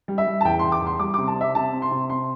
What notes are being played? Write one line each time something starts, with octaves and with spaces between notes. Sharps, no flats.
G3
E5
G3
A5
E2 G5
C6
E2
D6
E2 C6
G3 D6
C3 D6
A5
C4 E5
C3 A5
C4
C6
C3
C4 C6